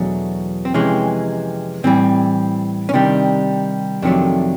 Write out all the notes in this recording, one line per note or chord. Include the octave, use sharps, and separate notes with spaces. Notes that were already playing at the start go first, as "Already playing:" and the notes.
Already playing: E2 B2 F#3 A3 D4
C4
F2 C3 E3 G#3 C#4
A2 E3 G3 C4
C#4
C3 D#3 G3 D4
F2 C3 D#3 F#3 A3 D4